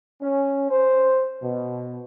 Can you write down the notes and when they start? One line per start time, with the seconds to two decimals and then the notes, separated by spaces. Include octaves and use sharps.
0.21 C#4
0.70 C5
1.43 B2